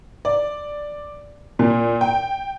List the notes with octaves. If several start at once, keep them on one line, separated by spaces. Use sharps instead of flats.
D5
A#2
G5